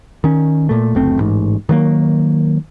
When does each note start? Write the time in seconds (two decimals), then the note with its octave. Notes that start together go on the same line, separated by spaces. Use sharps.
0.24 D#3 C#4
0.69 A#2 A3
0.95 F#1 D2 A3 C4
1.18 A1 G#2
1.69 D#3 F#3 G3 A#3